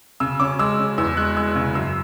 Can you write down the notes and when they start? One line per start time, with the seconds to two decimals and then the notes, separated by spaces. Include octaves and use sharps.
0.20 C#3 E6
0.40 C#4 D6
0.59 G#3 E6
0.79 C#4
0.98 E2 E6
1.17 G#3 F#6
1.36 G#3 E6
1.55 C#3
1.75 F#2 E6